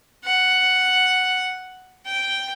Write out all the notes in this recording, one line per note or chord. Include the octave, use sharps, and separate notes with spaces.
F#5
G5